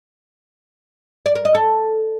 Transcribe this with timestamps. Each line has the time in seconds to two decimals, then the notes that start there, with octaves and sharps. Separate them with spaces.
1.26 D5
1.35 A#4
1.45 D#5
1.55 A4